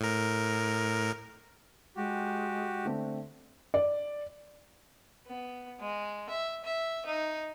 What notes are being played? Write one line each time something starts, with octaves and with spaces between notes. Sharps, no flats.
A2 A#4
G#3 F#4 G4
D3 A3 C4
D5
B3
G#3
E5
E5
D#4